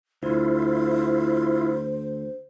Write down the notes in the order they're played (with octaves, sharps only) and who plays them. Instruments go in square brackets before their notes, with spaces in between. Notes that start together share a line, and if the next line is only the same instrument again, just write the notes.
[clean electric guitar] D2 [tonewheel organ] E4 F4 [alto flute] C5